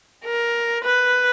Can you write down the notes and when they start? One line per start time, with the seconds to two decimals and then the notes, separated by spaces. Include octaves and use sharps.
0.25 A#4
0.84 B4